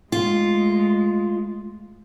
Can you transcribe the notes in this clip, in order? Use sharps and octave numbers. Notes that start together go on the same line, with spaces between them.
G#3 A3 F4